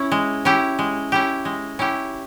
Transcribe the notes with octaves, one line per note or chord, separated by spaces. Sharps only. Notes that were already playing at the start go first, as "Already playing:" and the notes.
Already playing: C#4 E4
G#3
C#4 E4 G4
G#3
C#4 E4 G4
G#3
C#4 E4 G4